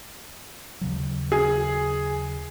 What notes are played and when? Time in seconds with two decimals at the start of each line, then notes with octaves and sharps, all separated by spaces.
0.81 D#2 C#3 F#3
1.32 G#4